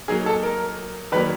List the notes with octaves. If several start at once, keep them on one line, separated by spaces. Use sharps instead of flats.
F#3 A#3 D#4 G#4
A4
A#4
D#3 F#3 A#3 D4 B4